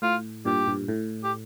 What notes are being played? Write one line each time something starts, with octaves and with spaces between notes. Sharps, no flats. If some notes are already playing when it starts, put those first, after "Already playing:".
A2 F4
G2 A#2 G4
G2
A2
G4